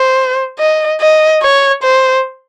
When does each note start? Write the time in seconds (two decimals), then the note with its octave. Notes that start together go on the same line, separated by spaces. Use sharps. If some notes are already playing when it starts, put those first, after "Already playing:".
Already playing: C5
0.59 D#5
1.01 D#5
1.43 C#5
1.83 C5